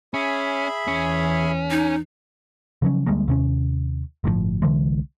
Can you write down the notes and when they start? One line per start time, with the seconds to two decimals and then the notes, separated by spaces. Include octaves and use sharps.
0.14 C#4 G#4 E5 B5
0.88 E2 C#4
1.71 D#4 G#5
2.82 C#3 F3 F#3 C#4
3.06 D2 G3 G#3 A#3
3.28 D#2 C3 C4 C#4
4.24 G1 A2 D3 F3
4.62 C2 D3 E3 G#3